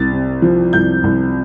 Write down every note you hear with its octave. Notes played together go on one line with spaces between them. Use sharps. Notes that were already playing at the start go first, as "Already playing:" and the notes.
Already playing: C2 A6
C3
F3
C2 G6
C2